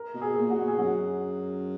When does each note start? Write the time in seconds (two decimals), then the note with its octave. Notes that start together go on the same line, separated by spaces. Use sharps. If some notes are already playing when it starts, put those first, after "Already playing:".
Already playing: A#4
0.15 B2
0.22 G#4
0.36 A#2
0.50 F#4
0.57 B2
0.68 G#4
0.78 F#2 F#4